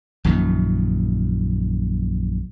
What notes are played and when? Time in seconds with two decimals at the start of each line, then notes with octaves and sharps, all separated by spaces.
0.25 A#1 F#2 A#2 D#3